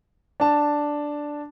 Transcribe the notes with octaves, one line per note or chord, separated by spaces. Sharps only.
D4 A5